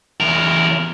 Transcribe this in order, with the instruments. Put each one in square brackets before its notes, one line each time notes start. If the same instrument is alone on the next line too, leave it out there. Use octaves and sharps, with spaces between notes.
[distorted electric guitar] E2 A#4